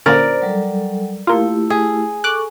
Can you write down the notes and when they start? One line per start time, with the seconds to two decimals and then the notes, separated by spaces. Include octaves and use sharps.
0.06 A#2 D3 C#4 A#4 C5 D5
0.42 F#3 G3 A4
1.27 A3 A#3 E4 F4 G4
1.70 G#4
2.24 A4 C#6 D6 F#6